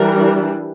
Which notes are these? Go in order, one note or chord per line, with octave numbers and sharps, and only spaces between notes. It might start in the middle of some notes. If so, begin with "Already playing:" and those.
Already playing: E3 G3 D4 A#4